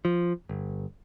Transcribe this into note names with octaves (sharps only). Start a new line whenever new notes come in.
F3
G1